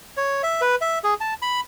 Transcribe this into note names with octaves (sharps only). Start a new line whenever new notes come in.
C#5
E5
B4
E5
G#4
A5
B5